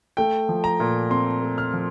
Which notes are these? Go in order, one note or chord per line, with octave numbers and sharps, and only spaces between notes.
A3 G5
F3
A#5
A#2
C4 C6
A3
F6
F3